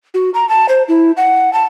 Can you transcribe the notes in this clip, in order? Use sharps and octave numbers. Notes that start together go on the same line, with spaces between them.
F#4
A#5
A5
C5
E4
F#5
A5